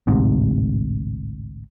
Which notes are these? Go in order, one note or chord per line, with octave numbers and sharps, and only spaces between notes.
A1 D2 G#2 C3